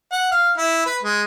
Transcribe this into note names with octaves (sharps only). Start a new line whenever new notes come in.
F#5
F5
E4
B4
G#3